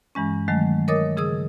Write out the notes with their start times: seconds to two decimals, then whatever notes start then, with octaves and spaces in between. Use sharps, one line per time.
0.15 G2 E3 G#3 C#4
0.48 D#3 F#3 G#3 A3
0.88 A#4 C#5 D#5 D6 D#6 A6
1.17 C#3 G#4 D#6 E6